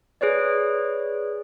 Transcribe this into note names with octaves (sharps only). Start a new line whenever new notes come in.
G#4 B4 C#5 D5